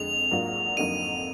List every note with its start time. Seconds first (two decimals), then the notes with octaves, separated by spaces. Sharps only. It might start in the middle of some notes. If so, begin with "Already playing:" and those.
Already playing: F2 D3 G#3 F7
0.31 G#2 F#3 A#3 D4 F4
0.77 F2 D3 F#3 A#3 D#4 D#7